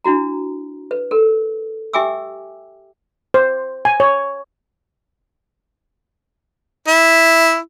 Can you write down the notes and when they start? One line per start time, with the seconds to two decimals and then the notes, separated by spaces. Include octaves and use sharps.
0.04 D4 E4 F#4 A#5
0.91 B4
1.11 A4 A#4
1.93 G4 E5 G5 G#5 D6 E6
3.34 C5
3.85 G#5
4.00 C#5
6.88 E4